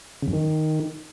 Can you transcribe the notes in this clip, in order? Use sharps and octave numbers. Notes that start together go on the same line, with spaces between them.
C#3
F#2
D#3